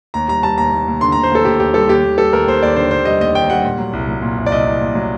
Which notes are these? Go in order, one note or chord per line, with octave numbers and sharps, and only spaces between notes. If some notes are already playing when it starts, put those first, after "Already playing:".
D#2 A#5
G3 A#5
G3 A5
D#2 A#5
D#2
D#2
D3 C6
D#2 A#5
C5
D#2 A4
D#2 G4
D#2 G4
G3 A4
D#2 G4
D#2
G3 A4
D#2 A#4
D#2 C5
D#2 D5
D3 C5
D#2 C5
G3 D#5
D#2 D#5
D#2 G5
G3 F#5
A#2
F#3
C2
F#3
A#2
C2
D5
C2 D#5
C2
A#2
F#3